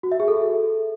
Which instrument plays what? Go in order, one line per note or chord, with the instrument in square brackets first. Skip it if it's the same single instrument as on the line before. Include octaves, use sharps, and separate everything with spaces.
[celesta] F#4
E5
G#4
A4